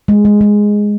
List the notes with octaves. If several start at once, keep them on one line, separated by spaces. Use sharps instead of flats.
G#3
G#3
G#3